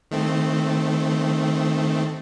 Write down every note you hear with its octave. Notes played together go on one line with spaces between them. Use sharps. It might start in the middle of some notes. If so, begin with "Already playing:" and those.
D#3 A3 C4